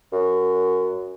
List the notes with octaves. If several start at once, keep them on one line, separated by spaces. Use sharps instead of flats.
F#2